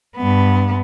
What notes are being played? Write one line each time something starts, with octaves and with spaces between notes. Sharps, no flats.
G2 B3